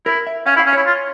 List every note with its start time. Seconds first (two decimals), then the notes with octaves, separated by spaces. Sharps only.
0.06 E4 A#4
0.27 E5
0.46 C#4 F5
0.56 E4
0.59 F5
0.66 C#4
0.73 E4 C#5
0.86 F4